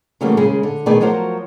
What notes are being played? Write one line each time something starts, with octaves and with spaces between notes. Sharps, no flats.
C#3 E3 F#3 G3 A3 A#3
D#2 C#3 G#3 A#3 G#4
D3
B2 D#3 A3 G#4 B4 D5
F3 F#3 F#4 A#4 C5